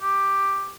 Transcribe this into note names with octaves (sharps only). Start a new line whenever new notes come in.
G4